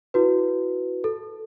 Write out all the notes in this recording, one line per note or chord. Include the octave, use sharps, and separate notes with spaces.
E4 F#4 B4
A4